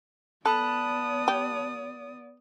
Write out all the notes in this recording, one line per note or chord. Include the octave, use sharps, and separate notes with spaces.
B3 A4 D5 A5 B5 D#6 F#6
G4